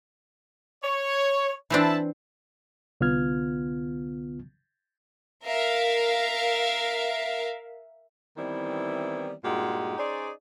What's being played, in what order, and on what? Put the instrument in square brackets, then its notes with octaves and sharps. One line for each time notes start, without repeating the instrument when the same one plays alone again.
[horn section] C#5
[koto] E3 C4 D4 [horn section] E4 A5
[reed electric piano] C2 D3 B3 F4 F6 G#6
[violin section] A#4 E5 F5
[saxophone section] D#3 E3 G3 B3 C4 E4
G2 A#2 G#3 D#4 F#4 G4
C#4 D#4 G#4 C5 D5